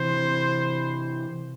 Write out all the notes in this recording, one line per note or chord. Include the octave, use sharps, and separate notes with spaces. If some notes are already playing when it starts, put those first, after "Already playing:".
Already playing: C3 E3 C5